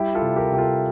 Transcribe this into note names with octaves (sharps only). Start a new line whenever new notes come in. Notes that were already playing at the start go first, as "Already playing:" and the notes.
Already playing: G3 E4 G4
F4 A4
C3
G4 A#4
C3 G4
F4 A4